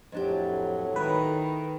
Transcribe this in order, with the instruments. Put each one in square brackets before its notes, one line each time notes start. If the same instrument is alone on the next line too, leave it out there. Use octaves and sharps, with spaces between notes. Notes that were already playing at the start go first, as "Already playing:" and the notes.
[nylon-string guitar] F2 D4 G4 [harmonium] A2 F#3
[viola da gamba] D#3 [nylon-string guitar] A3 E4 [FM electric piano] B4